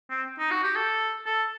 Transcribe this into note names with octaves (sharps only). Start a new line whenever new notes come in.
C4
D#4
F#4
G4
A4
A4